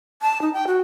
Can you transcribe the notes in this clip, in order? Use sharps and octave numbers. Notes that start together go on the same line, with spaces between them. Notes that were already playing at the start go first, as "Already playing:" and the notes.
A5
D#4
G5
F#4